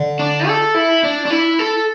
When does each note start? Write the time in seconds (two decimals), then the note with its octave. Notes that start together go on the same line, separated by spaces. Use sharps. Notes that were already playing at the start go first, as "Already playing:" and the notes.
Already playing: D3
0.19 D4
0.47 A4
0.74 E4
1.04 D4
1.25 D4
1.30 E4
1.59 A4